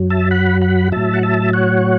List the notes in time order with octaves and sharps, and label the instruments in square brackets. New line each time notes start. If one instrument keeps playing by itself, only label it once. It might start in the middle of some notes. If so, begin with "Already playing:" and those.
Already playing: [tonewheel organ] F#2 F#3
E5 A5
F#5 B5
F#5 B5
A2 F#3 E5 A5
F#5
E5 A5
C#5 F#5